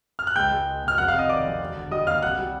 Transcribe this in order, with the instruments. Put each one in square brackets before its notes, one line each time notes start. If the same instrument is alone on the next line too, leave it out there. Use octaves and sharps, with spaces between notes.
[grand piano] F6
F#6
C#2 G5 G6
G#3
C#2
B2
F6
F1 F#5 F#6
F5 F6
C3
D#5 D#6
D#3 D5 D6
F2
E1
D3
G3 D#5 D#6
D#2 F5 F6
C2 F#5 F#6
G3